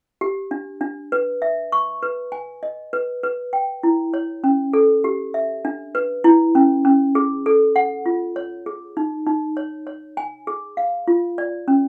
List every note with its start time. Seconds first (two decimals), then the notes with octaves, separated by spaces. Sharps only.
0.21 G4
0.51 D4
0.81 D4
1.12 B4
1.42 E5
1.72 C#6
2.03 B4
2.32 G#5
2.63 D#5
2.93 B4
3.23 B4
3.53 G5
3.83 E4
4.14 C#5
4.44 C#4
4.73 A4
5.04 G4
5.34 E5
5.65 D4
5.95 B4
6.24 E4
6.55 C#4
6.85 C#4
7.15 G#4
7.46 A4
7.76 F#5
8.06 F4
8.36 C#5
8.66 G#4
8.97 D#4
9.27 D#4
9.57 C#5
9.87 C#5
10.17 G#5
10.47 G#4
10.77 F5
11.08 F4
11.38 D5
11.68 C#4